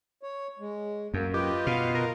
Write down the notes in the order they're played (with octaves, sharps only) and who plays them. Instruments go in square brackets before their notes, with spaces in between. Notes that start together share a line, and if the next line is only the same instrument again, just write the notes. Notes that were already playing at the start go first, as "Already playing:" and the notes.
[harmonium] C#5
G#3
[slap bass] F#2 [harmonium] A#3
[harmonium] F4 B4 D#5 [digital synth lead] G4
[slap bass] B2 [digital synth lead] F5
[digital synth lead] A#4